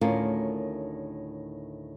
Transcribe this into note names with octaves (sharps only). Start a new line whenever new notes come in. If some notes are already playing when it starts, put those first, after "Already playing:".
D2 A2 D#3 C#4 F4 A#4